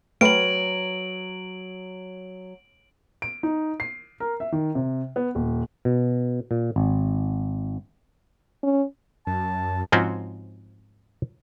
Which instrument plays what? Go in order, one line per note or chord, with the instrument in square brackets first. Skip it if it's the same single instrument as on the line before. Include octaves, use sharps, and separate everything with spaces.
[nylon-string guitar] F#3 [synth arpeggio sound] A3 [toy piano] B4 G5 B5 [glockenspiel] D7 F#7
[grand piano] D7
D#4
C7
A#4
E5
D#3
C3
B3
D#1
[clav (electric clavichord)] B2
A#2
G#1
[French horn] C#4
[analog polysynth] F#2 [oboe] A5
[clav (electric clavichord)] G#2 F3 C4 C#4 F#4